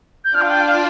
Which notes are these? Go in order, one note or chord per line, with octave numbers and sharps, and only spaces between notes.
G6
D4 F4 D5 F6
F5
G5
F5